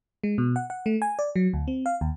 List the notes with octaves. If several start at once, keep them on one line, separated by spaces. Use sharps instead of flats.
G#3
B2
F#5
F#5
A3
G#5
D5
F#3
D2
C4
F5
D#2